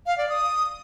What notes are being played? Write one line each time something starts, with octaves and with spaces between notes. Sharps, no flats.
F5
D5
D#6